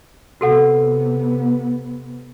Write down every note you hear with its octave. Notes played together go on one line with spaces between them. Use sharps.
C3 B3 F#4 A4 F#5